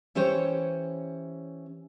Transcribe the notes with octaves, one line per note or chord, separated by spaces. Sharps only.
E3 C#4 G4 C5 C#5